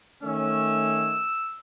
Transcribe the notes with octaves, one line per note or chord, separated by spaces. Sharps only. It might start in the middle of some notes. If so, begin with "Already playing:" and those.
D#3 A3 C#4 E6